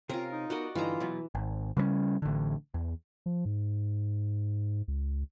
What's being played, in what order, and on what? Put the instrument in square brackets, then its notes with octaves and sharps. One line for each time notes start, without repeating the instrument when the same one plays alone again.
[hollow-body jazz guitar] C3 C4 C#4 [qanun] F4 A#4
[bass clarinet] D#4
[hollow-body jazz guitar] B3 A#4 [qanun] F#4 D5 D#5
[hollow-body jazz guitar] G2 D3 D#4 [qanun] E3 A#5 [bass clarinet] F4
[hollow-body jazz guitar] B2 F#3 B3
[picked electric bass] G#1
C#3 G3 A3 C#4
A1 D3
E2
[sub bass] F3
G#2
C#2